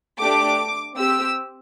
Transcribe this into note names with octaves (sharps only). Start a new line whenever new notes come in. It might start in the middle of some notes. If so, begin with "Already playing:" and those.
A3 D4 G4 D6
C4 G4 E6